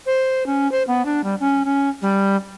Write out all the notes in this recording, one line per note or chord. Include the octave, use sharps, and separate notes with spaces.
C5
C#4
C5
B3
D4
G3
C#4
C#4
G3